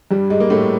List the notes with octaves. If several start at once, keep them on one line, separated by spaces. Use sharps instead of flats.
G2 G3
G#2 G#3
A#3
A2 A3